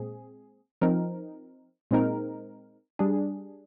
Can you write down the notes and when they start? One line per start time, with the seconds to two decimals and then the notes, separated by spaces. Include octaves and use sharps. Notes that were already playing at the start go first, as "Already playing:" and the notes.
Already playing: A#2 G#3 C4 G#4
0.82 F3 C4 D#4 A#4
1.91 A#2 G#3 C4 D#4 A#4
2.99 G3 D4 G#4